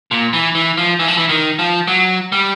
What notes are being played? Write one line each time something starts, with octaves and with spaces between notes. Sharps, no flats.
A#2
E3
E3
F3
E3
F3
E3
D#3
F3
F#3
G3